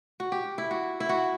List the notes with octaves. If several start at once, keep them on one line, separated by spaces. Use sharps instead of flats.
F#4
G4
E4
F#4
E4
F#4